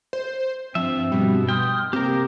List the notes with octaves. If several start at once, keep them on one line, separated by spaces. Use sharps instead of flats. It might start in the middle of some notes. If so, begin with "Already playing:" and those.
C5
G2 F3 C4 E5
B2 G3
G5 C6 D#6 F6
C3 A#3 C4 G4 A#4